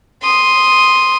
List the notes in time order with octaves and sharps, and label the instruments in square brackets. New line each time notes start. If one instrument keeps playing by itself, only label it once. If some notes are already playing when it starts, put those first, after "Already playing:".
[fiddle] C6 D#6